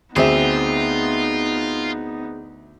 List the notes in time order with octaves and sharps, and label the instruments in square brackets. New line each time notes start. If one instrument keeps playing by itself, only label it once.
[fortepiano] D2 E5 [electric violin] B3 D#4 [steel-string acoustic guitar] C4 G#4 [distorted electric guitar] F4